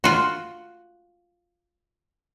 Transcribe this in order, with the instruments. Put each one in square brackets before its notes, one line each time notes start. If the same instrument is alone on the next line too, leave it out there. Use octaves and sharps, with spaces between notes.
[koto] F4 F#4